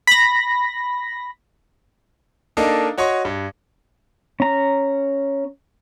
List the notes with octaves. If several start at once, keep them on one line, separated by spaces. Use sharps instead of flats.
B5 A#6
A#3 D4 D#4 A4 D#5 F5
F#4 C#5 D#5 C6 C#6
G2
C#4 A#5